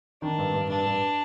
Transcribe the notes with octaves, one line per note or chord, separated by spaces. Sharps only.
D#3 D4
G2
G2
G2 D4
G2